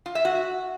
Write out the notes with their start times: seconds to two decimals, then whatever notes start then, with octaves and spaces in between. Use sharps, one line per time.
0.06 F4
0.15 E5
0.25 F#4